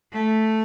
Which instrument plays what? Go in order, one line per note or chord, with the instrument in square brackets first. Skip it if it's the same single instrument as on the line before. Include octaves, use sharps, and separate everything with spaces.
[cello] A3